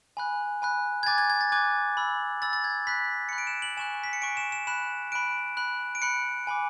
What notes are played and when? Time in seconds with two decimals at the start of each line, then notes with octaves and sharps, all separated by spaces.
0.17 G#5 B5 F#6
0.62 G#5 B5 F#6
1.03 G#6
1.06 G#5 D6 F#6 A6
1.18 G#6
1.30 G#6
1.41 A6
1.52 G#5 D6 F#6 G#6
1.97 B5 E6
2.42 B5 E6 A6
2.53 A6
2.64 G#6
2.87 B5 F#6 B6
3.29 B5 F#6 C#7
3.38 D7
3.47 E7
3.62 F#7
3.77 G#5 C#6 F#6 E7
4.04 B6
4.13 C#7
4.22 G#5 C#6 F#6 D7
4.37 E7
4.52 E7
4.67 B5 F#6 E7
5.12 B5 F#6 D7
5.57 B5 F#6
5.95 D7
6.02 B5 F#6 C#7
6.47 G#5 B5 D6